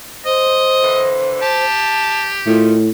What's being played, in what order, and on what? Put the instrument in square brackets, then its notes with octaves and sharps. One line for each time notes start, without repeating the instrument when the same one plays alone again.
[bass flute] C5 [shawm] D#5
[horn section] D3 E3
[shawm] G4 [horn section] A5
[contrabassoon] A2 [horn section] D#3 A3 [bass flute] F4